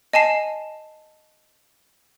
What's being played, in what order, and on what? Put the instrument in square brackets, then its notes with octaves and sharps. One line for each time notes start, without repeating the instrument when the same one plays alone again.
[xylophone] D#5 G#5 A5 C7